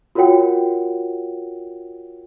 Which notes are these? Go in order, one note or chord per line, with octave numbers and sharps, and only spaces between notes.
F4 F#4 A#4 C#5 F#5 G5